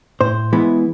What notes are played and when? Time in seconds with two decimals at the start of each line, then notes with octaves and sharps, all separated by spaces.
0.21 A2 C5
0.53 E3 G#3 B3 E4